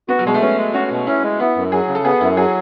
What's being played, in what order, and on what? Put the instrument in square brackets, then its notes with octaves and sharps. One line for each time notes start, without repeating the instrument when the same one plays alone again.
[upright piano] B3 [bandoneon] F#4
[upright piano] F#3
[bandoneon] B2 [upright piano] G#3
[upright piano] A3
[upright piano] B3 [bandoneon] C#4
[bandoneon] G#3
[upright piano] C#4 [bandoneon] F#4
[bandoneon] B2
[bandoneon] C#4 [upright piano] E4
[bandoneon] G#3
[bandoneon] B3 [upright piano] E4
[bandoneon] F#2
[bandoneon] F#3 [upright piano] G#4
[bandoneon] C#3
[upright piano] A4
[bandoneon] B3 [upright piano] G#4
[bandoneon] F#2 [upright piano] E4
[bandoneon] F#3 [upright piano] G#4